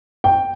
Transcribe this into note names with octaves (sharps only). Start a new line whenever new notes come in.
G5